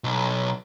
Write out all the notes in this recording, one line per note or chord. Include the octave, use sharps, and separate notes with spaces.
B1